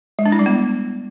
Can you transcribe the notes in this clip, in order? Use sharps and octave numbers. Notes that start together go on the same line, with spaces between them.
G#3
D4
E4
G3
B3